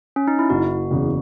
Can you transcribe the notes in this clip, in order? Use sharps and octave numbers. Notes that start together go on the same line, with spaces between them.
C#4
D#4
E4
F#1 F#4
E2 C#3